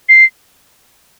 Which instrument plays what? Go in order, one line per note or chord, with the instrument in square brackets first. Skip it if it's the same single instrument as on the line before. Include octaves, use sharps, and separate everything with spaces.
[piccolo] C7